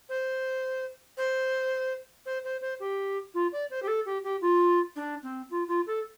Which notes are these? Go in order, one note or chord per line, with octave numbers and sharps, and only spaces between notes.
C5
C5
C5
C5
C5
G4
F4
D5
C5
G4
A4
G4
G4
F4
D4
C4
F4
F4
A4